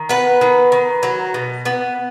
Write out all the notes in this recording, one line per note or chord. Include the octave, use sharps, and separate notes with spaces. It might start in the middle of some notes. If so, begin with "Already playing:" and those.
Already playing: D#3
B3 B4
D#3
D#3
F#3
B2
B3